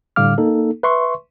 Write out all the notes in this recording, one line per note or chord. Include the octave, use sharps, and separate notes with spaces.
A2 D3 G3 F5 D6 F6
A#3 D#4 A4
B4 E5 C6 C#6